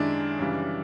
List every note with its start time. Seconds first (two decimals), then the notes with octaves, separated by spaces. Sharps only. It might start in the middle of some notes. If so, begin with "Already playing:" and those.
Already playing: F#2 D#3 G#3 D4 E4
0.39 F#2 C#3 E3 G3